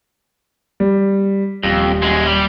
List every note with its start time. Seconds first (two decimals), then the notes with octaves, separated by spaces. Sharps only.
0.80 G3
1.63 D#1 F2
2.02 F#2 G#3
2.27 G3